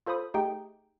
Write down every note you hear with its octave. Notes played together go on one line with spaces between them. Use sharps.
F4 A4 C5 B5 D#6
A3 D#4 G4 G#4 G5